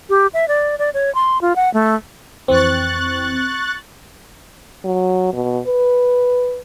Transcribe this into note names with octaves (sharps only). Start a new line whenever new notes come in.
G4
E5
D5
D5
C#5
C6
F4
F#5
A3
F2 E3 C4 C#6 F#6 A6
F#3
B2
B4